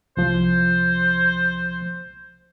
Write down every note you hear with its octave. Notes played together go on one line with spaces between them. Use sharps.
C2 F3 C5